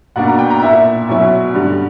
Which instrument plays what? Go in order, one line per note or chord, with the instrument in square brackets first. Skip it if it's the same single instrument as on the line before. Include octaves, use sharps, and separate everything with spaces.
[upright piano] B2 A#3 D4 F#5
A#5
G5
A#5
A#2 A#3 E4 E5
B2 F#3 C#4 E4
G2 D3 G3